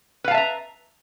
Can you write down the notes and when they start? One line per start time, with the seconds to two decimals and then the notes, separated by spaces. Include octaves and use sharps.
0.24 B4
0.28 F5
0.31 A5
0.34 E5
0.38 A#5